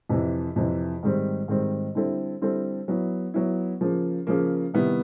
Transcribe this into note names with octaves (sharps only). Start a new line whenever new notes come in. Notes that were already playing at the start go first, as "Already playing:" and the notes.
F2 C3 E3
F2 C3 E3
G#2 D#3 G3 C4
G#2 D#3 G3 C4
D3 G3 C4 E4 A4
D3 G3 C4 E4 A4
F#3 B3 E4
F#3 B3 E4
C#3 F3 A#3
C#3 F3 A#3
C3 D#3 G3 B3 E4